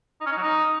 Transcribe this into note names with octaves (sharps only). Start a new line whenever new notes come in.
D#4
C#4
D#4
F#3
D#4